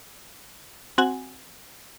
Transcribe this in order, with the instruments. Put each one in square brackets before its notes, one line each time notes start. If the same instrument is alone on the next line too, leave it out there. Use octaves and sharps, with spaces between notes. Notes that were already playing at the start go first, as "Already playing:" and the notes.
[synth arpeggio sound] C4 F#4 F#5 G#5